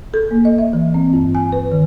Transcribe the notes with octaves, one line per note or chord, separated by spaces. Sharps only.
A4
A#3
D#5
E5
E3
C4
G2
G#5
B4
D#3